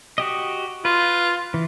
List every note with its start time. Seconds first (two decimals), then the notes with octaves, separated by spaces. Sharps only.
0.18 F#4 G4 D#5
0.85 F4 B4
1.54 E3